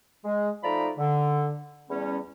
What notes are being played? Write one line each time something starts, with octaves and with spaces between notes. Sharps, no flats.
G#3
F3 A3 D#4 D5 A#5 B5
D3
E2 G3 C#4